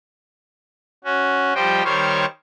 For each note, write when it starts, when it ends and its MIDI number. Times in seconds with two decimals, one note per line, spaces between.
1.04 1.53 61
1.04 1.53 66
1.55 1.83 53
1.55 1.83 55
1.55 1.83 67
1.55 1.83 72
1.55 1.83 75
1.55 1.83 79
1.84 2.25 51
1.84 2.25 55
1.84 2.25 72
1.84 2.25 73
1.84 2.25 77
1.84 2.25 85